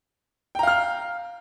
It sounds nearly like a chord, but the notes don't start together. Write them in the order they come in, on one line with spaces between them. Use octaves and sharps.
G5 A#5 F5 F6